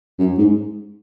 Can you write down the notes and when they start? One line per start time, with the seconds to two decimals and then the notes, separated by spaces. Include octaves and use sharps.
0.19 F#2
0.38 G#2